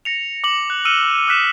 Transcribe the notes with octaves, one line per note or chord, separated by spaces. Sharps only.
A#6 C#7 F7
D6 F#7
F#6
E6 F6 C#7 D#7 E7 G7
D#6 F6 F#6 B6 E7